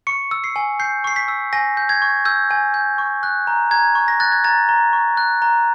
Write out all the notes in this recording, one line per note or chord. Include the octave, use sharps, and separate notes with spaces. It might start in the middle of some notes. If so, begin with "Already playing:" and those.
C#6 C#7
E6
C7
G#5
G6 C7
C#6 C7
B6
E6
G#5 A#6
G6
G#6
C#6
E6 G6
G#5
G6
C#6
F#6
A#5
A#5 G#6
C#6
A#6
F#6 A6
G#6
A#5 A6
A#5
C#6
F#6
A#5